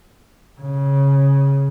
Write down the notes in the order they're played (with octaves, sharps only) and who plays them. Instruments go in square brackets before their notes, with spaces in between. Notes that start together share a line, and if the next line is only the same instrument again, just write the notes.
[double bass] C#3